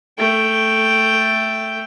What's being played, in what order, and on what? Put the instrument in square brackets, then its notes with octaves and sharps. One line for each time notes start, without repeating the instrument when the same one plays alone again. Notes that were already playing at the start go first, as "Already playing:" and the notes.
[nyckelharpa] A3 G5